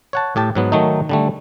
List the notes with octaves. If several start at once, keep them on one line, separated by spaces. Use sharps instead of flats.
C#5 F#5 A5
A2 G4 A5
G#2 F#3 B3
D#3 F#3 A3 D#4
D3 G3 A3